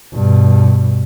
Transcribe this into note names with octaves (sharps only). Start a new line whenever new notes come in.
G2 B2